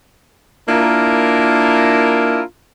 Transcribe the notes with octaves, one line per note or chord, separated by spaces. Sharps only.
A#3 D4 E4 F4 A#4